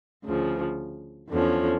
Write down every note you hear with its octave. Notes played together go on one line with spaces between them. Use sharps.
D2 C#3 F3
E2 D3 F3 C#4